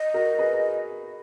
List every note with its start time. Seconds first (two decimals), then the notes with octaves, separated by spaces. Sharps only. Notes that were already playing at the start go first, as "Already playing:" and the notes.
Already playing: D#5
0.14 F#4 A#4
0.39 G#4 B4